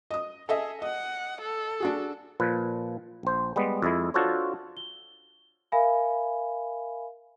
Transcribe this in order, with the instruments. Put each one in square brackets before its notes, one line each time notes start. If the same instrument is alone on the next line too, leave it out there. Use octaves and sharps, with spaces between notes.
[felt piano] D#5 D#6
[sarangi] G#4 [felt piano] A4 D#5 E5
[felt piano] D#5 [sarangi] F#5
[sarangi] A4
[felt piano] D4 F#4 G#4
[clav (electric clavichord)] A#2 F3 B4
A#1 C5
G3 G#3 B3
F2 G#3 E4
D4 F4 F#4 A4 C5 C#5
[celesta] G7
A#4 E5 F5 G#5 B5